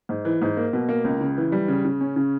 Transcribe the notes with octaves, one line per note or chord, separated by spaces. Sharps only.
G#2
E3
G#2
A#3
B2
A#3
C#2
C#3
E3
G3
C#3
C#3
C#4
C#3